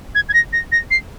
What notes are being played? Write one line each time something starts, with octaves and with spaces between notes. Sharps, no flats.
G#6
G#6
A#6
A#6
A#6
C7